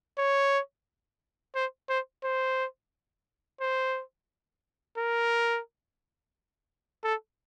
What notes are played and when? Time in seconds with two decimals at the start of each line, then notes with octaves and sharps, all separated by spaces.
0.18 C#5
1.55 C5
1.89 C5
2.24 C5
3.61 C5
4.98 A#4
7.04 A4